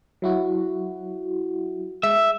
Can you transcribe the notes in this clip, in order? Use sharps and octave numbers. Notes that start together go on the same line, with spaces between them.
F#3 E4 F#4
G#3 E5